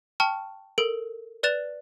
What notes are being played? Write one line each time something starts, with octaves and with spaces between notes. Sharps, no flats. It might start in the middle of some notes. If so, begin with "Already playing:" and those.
G5 A5 C#6 F6
A4 A#4 D7
B4 D5 F#6 A6 E7 F7